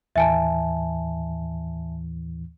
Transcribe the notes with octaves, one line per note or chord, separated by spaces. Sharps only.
D#2 A2 E3 E5 G#5 A5